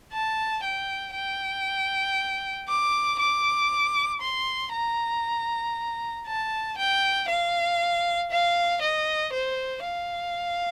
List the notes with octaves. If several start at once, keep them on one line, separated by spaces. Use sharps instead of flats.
A5
G5
G5
D6
D6
C6
A#5
A5
G5
F5
F5
D#5
C5
F5